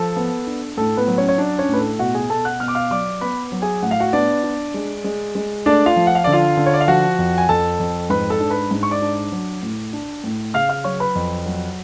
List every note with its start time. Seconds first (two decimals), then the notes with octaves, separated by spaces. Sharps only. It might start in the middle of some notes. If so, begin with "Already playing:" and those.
Already playing: F3 A4
0.16 B3
0.47 D4
0.77 A2 A4
0.97 B3 B4
1.08 F#3
1.18 C#4 C#5
1.28 C#5
1.38 D4 D5
1.59 C#4 C#5
1.69 A2 B4
1.79 A4
1.99 B2 F#4 F#5
2.14 G#4 G#5
2.30 B2 A4 A5
2.45 F#5 F#6
2.60 B2 F6
2.68 D6
2.75 F5 F6
2.91 F#3 D5 D6
3.21 B3 B4 B5
3.52 F#3
3.62 G#4 G#5
3.83 A2 F#5
3.91 F5
4.00 F#4 F#5
4.13 B3 D4 D5
4.44 D4
4.74 G#3
5.04 G#3
5.35 G#3
5.66 A3 D4 D5
5.86 F4 F5
5.96 F3
6.07 F#5
6.15 F5
6.24 D3 D5
6.32 F4 F5
6.57 D3
6.66 C#5
6.74 D5
6.81 F5
6.88 F3 F#4 F#5
7.18 F2
7.38 G#5
7.49 F2 A4 A5
7.80 F2
8.10 G#2 B4 B5
8.30 A4 A5
8.40 D4
8.50 B4 B5
8.71 G#2
8.83 C#6
8.91 D5 D6
9.02 D4
9.32 F#3
9.63 A2
9.93 D4
10.24 A2
10.54 C#3 F5 F6
10.69 F5 F6
10.84 F#3 C#5 C#6
11.00 B4 B5
11.15 F2
11.46 F#3